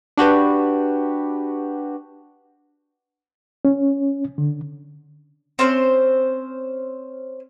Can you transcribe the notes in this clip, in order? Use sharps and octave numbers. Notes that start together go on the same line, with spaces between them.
D4 F#4 G4 B4
C#4
D3
C4 C#4 C5